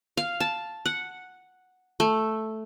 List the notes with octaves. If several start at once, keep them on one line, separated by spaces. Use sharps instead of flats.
F5
A5
F#5
A3